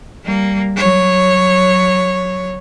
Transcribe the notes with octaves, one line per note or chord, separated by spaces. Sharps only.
G3 A#3
F#3 C#5